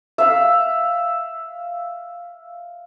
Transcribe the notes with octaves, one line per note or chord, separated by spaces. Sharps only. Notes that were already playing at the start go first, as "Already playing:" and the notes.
E5 F5